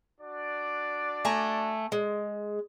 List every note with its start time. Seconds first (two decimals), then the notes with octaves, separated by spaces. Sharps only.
0.20 D4 F#4 D5
1.25 A3 G#5 A#5
1.92 G#3